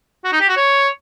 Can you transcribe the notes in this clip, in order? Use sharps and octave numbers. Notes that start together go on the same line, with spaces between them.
F#4
D#4
G4
F#4
C#5